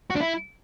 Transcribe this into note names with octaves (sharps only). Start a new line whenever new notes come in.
F#4
D4
E4